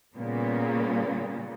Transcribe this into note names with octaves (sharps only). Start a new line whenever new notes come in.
A#2 C#3 G3 A#3 B3